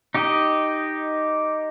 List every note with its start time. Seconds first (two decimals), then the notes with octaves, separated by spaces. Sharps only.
0.14 D#4 G4 D#5